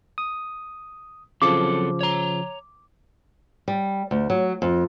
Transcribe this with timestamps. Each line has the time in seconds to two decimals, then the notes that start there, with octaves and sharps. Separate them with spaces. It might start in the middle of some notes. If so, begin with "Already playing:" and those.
0.18 D#6
1.42 C#3 F3 F#3 C4 A4 D6
2.01 C#5 A#5
3.68 G3
4.11 D2
4.30 F#3
4.62 F2